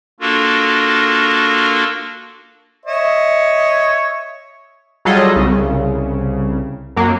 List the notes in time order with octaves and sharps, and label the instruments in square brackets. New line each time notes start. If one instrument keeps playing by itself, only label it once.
[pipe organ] A#3 D4 F4 F#4 A4 A#4
[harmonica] C#5 D#5 E5
[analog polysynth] F#3 G3 F4 G#4 A4 D#5
C2 C#3
F#2 F#3 A#3